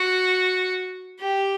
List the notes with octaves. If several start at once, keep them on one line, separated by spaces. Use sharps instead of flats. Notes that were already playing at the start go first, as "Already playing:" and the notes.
Already playing: F#4
G4